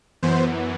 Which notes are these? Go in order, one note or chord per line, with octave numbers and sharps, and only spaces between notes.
F#2 E3 B3 C5